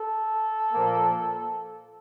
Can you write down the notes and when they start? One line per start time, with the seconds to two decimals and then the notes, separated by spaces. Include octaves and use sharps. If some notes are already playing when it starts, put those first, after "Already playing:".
Already playing: A4
0.73 A#2 F3 A#3